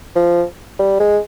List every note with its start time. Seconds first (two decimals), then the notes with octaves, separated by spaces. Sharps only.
0.16 F3
0.79 G3
1.00 G#3